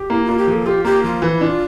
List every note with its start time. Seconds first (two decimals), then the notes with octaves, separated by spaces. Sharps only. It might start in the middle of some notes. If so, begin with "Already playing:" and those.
Already playing: G4
0.10 A#3 E4
0.24 A#3 F4
0.37 G4
0.47 F3 A4
0.66 F4 G4
0.85 A#3 G4
1.03 F3 F4
1.22 E3 E4
1.41 D4 F4